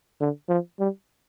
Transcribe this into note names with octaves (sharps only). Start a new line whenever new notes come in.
D3
F3
G3